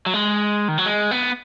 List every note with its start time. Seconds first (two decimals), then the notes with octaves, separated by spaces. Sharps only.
0.06 F#3
0.14 G#3
0.68 D#3
0.78 F#3
0.86 G#3
1.11 B3